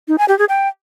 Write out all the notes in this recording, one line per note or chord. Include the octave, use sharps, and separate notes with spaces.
D#4
G#5
G4
G#4
G5